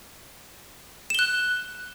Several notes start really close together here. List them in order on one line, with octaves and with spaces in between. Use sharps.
E7 G7 F#6